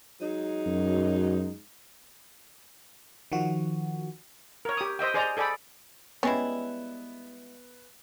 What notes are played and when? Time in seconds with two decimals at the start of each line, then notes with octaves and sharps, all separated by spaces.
0.21 F#3 G#3 D#4
0.66 F#2
3.32 D#3 F3 F#4
4.65 A#4 C#5
4.77 G4 D#6
4.99 C5 D#5 E5 G5
5.14 G#4 C5 D5 D#5 A#5
5.37 G#4 A4 D5 G5 B5
6.23 G3 G#3 B3 C#4 E4